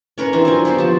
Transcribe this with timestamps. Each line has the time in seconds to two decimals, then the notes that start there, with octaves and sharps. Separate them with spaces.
0.18 C#4 A#4 B4 C#5
0.33 E3 C4 D4
0.45 F#3 F4 A#4 G#5
0.65 B3 F#4 G4 C5
0.78 F3 A5